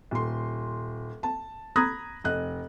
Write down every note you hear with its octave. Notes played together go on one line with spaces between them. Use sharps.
D#1 C6
A5
A#5 B5 D#6 F#6 G#6 A#6
F1 D#5 F#6